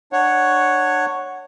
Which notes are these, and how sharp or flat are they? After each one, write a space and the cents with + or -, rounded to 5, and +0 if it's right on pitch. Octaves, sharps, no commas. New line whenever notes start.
D4 +25 C#5 +0 F#5 +0